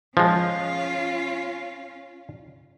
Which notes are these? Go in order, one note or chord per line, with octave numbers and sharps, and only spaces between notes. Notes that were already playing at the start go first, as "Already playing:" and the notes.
F3 G#3 C#4 F4